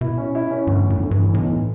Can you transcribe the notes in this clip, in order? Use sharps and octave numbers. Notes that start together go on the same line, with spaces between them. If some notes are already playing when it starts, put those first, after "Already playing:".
B2 E4
C#4
E4
C#4
D2 G2
D2
F#2
D2
G2
E3
B1 A2